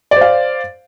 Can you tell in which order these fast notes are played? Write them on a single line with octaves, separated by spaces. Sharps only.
D5 C5 F5